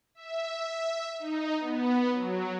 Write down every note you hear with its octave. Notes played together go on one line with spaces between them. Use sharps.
E5
D#4
B3
F#3